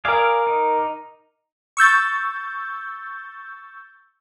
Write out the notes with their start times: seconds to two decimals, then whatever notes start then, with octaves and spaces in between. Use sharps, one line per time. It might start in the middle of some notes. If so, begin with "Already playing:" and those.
0.05 G#4 A#4 D5 F5 D6
0.47 D#4
1.77 C#6 E6 G6 A6